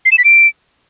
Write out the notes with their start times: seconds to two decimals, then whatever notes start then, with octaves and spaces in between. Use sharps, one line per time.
0.05 C7
0.12 E7
0.18 B6
0.25 D7